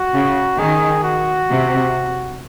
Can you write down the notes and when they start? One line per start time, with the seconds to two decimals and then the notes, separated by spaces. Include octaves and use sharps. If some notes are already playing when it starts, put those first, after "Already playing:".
Already playing: F#4
0.14 C#3
0.59 D#3 G#4
1.04 F#4
1.49 C3